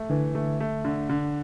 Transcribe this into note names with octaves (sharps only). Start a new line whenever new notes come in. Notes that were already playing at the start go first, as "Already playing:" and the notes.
Already playing: A3
D3 E3
D3 A3
A3
D3
D3